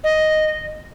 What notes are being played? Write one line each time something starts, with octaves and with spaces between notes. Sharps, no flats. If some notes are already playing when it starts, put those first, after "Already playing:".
D#5